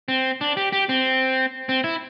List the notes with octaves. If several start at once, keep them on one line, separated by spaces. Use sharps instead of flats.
C4
D4
G4
G4
C4
C4
E4